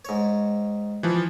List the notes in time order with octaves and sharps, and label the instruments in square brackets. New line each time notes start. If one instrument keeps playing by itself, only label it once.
[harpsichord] G#2 C#5
[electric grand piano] E3 F3